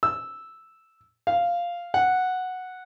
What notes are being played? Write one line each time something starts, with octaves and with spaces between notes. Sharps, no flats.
E6
F5
F#5